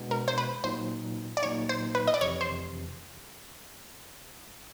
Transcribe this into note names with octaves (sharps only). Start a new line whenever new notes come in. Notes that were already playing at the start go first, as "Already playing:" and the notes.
Already playing: B2 G#3 B3 D4
A#4
C5
B4
A#2 F#3 A#3 D#4 C5
D5
A#2 F#3 A#3 D#4 C#5
C5
B4
D#5
D5
F2 C3 E3 C#5
C5